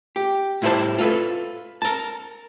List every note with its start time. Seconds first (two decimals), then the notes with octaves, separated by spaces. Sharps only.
0.16 G4
0.62 A2 G3 E4 B4 C5 A5
0.98 F4 A4 B4
1.82 A#4 A5